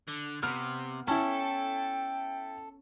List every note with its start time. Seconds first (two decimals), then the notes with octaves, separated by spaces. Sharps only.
0.08 D3
0.43 C3 B3 F6
1.08 C#4 E4 A4 G5 A5